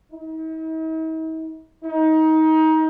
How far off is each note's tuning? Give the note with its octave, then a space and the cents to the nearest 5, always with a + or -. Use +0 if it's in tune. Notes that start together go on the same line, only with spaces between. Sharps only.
D#4 +45
D#4 +25